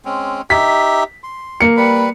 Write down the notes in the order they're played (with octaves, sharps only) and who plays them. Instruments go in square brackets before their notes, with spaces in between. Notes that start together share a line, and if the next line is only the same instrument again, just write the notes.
[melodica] G#3 C4 C#4
[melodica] D#4 G4 E5 [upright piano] B6
[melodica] C6
[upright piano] A#3 C#7
[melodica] G3 B4 B5